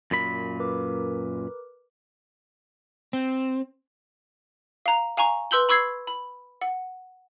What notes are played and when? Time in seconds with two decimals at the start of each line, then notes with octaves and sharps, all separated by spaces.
0.11 F#2 A#2 B5
0.60 A#4 B4 D6
3.13 C4
4.86 F5 A#5
5.17 F5 G#5 A#5 C#6
5.51 B4 C6 E6 G6 F#7 G7
5.69 B5 C#6 E6 G#6 C7
6.07 B5
6.62 F#5